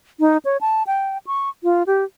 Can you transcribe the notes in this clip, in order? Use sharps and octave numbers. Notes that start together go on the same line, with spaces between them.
D#4
C#5
A5
G5
C#6
F4
G4